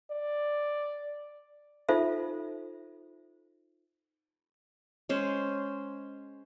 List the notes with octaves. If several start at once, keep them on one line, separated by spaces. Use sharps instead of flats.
D5
D#4 F4 A4 C5 E5
G#3 C#4 C5